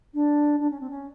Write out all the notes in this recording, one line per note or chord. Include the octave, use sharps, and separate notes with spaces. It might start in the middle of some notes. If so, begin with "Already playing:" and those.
D4
D4
C#4
C4
C#4